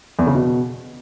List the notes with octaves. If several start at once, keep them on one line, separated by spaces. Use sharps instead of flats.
E2
C#3
B2